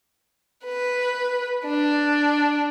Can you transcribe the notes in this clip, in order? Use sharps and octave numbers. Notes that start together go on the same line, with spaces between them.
B4
D4